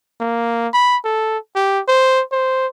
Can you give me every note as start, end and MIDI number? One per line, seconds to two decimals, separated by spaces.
0.20 0.68 58
0.73 0.97 83
1.05 1.38 69
1.55 1.80 67
1.88 2.22 72
2.32 2.67 72